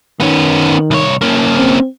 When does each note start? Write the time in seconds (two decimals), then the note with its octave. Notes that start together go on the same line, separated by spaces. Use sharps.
0.20 D#3 B3 C#4
0.91 C2 C#5
1.21 A#3 C#4
1.56 C4